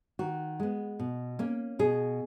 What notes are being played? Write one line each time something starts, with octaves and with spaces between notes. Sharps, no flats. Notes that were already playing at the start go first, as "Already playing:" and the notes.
D#3 F#4
G#3 B3
B2
A#3 C#4
B2 G#4